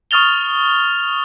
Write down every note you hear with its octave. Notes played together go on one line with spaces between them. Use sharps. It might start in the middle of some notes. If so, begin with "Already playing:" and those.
C#6 D#6 F6 A6 F7 G7